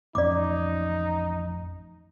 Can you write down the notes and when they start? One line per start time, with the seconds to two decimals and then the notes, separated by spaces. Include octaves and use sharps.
0.15 A1 F2 C#4 D#4 D5 D6